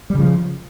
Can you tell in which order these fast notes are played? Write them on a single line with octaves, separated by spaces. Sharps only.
G3 C#3 F3